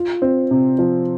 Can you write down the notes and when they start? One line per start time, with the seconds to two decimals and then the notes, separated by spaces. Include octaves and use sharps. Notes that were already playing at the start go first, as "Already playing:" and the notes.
Already playing: F4
0.22 C4
0.51 C3
0.79 F3